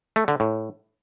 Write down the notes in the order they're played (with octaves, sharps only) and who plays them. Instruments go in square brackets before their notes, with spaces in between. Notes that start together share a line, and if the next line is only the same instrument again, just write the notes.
[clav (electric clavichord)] A3
D3
A2